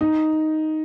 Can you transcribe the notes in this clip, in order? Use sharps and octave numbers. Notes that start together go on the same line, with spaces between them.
D#4